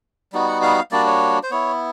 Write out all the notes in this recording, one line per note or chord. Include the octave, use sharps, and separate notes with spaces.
G3 B3 D#4 F#4
F#5
F5
G3 A#3 D4 F#4 D5
C#5
C5
B3 E4 C#5